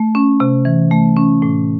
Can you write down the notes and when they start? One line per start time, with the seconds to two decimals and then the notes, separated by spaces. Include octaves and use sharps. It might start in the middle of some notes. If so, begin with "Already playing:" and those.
Already playing: A3
0.15 C#4
0.40 C3
0.65 E3
0.91 A3
1.17 C#4
1.42 A2